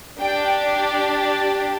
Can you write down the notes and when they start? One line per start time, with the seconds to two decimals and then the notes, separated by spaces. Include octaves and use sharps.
0.20 D4 G4 G5
1.06 A5